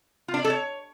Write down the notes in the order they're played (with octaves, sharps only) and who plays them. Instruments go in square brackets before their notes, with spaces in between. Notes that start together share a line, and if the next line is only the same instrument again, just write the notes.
[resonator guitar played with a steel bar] F4
D4
D5
A4
C#5